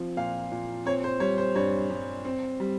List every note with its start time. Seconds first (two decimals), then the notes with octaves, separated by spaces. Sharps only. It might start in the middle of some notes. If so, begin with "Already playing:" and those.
Already playing: F3 C4
0.17 A#2 F5
0.51 A#2
0.86 C4 C#5
1.04 C5
1.20 G3 C#5
1.38 C5
1.55 G2 C#5
1.90 G2
2.25 C4
2.60 G3